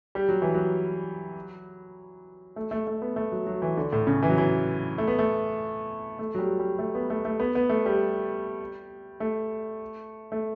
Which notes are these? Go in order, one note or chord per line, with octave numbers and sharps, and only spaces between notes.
G3
F#3
E3
F#3
A3
A3
A3
B3
A3
F#3
F#3
E3
D3
A2
C#3
E3
F#3
E3
A3
B3
A3
A3
F#3
G3
G3
A3
B3
A3
A3
B3
B3
A3
G3
A3
A3